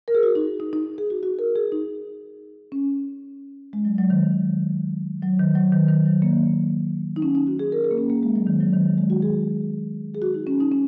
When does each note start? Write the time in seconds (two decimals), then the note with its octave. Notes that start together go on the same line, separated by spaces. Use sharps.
0.08 A#4
0.15 G#4
0.23 F#4
0.35 D#4
0.60 D#4
0.73 D#4
0.98 G#4
1.10 F#4
1.23 F#4
1.39 A#4
1.56 G#4
1.72 D#4
2.72 C#4
3.73 G#3
3.85 F#3
3.98 F#3
4.10 D#3
5.23 F#3
5.39 D#3
5.55 F#3
5.72 D#3
5.89 D#3
6.06 F#3
6.22 A#3
7.16 D#4
7.22 C#4
7.35 D#4
7.47 F#4
7.59 G#4
7.72 A#4
7.84 G#4
7.91 A#3
7.98 C#4
8.10 A#3
8.23 G#3
8.35 F#3
8.47 D#3
8.60 F#3
8.73 D#3
8.84 F#3
8.98 G#3
9.10 F#4
9.22 G#4
10.15 G#4
10.22 F#4
10.34 D#4
10.47 C#4
10.60 D#4
10.72 C#4